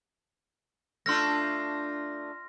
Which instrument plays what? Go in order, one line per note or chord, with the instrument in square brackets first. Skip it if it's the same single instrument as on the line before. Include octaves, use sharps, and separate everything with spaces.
[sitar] A3 D4 F4 [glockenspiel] C6 F6 A#6